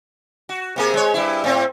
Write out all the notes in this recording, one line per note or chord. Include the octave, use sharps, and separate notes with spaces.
F#4
C3 A#3 G#4
G#3 C#5
G2 E4
A2 C4